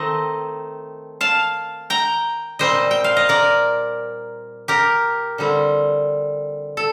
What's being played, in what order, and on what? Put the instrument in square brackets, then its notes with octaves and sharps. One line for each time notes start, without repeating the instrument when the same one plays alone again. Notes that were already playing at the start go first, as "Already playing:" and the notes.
Already playing: [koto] D#3 A3 C4 D#5
F5 A5
G5 A#5
A#2 G3 C4 C5 D#5
G5
F5
D#5
A#4 D5
G4 A#4
D3 G3 C4
A4